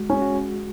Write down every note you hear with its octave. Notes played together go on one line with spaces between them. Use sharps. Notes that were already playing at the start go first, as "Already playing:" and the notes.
Already playing: G#3 F#4
C#4 G#4
F#4